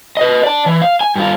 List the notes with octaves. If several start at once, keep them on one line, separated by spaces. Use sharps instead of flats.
B4 D#5
D5 A5
E3
F5
G#5
G2 F4